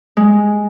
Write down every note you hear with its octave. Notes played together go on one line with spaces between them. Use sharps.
G#3